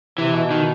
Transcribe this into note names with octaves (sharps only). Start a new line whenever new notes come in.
C3 E3
B2
D#3